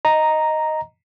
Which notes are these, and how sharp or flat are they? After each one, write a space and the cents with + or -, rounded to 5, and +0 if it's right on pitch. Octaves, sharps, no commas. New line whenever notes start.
D#5 +0 A#5 +0